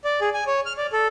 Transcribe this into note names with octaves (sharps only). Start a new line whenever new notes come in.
D5
G#4
G#5
C#5
F6
D5
A4